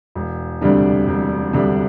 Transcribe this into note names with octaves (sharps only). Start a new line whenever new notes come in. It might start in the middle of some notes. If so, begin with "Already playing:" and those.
E1
D2 C3 G3 D4
E1
D2 C3 G3 D4